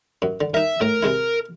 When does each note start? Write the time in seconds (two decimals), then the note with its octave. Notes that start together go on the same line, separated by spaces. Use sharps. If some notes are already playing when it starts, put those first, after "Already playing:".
0.22 F#2
0.41 D3
0.54 D#4 A#4 E5
0.81 A2 A#4
1.03 C3 G#3 E4